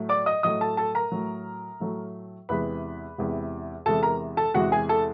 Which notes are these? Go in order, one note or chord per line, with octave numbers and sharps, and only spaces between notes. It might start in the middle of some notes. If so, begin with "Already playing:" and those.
Already playing: A2 F#3 A3
D5 D6
D#5 D#6
A2 F#3 A3 D#5 D#6
A4 A5
A4 A5
A#4 A#5
A2 F#3 A3
A2 F#3 A3
E2 C3 E3 G#3 B4 B5
E2 C3 E3 G#3
E2 C3 E3 G#3 A4 A5
A#4 A#5
A4 A5
E2 C3 E3 G#3 F#4 F#5
G#4 G#5
A4 A5